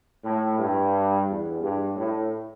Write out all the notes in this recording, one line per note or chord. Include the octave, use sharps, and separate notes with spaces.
A2
G2
E2
G2
A2